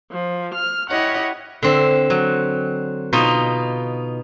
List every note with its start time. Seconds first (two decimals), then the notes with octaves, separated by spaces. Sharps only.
0.12 F3
0.55 F6
0.91 E4 G4 C#5 D#5 F#5
1.63 D3 C4
2.10 F#3
3.13 B2 D#4 F4